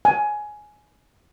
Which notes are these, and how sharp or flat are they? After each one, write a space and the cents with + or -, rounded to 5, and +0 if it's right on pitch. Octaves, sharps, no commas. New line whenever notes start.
G#5 +15